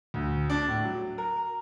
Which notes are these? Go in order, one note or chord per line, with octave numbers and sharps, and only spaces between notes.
D2
D4
A2
F#3
A#4